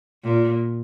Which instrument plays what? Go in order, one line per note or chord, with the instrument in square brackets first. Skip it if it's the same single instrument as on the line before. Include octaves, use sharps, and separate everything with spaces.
[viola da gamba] A#2